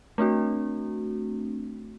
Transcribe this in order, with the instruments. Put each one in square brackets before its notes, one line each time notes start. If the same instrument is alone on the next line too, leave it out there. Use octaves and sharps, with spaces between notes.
[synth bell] A3 C4 D4 F#4